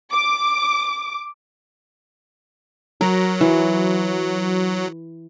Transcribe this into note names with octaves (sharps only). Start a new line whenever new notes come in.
D6
F#3 A#4
E3